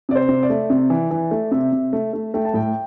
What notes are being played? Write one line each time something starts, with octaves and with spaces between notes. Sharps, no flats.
C3 D5
C5
C3
D5
A3
C3
E3
E3
A3
C3 E5
C3
A3
A3
A3 G5
A5
A2 G5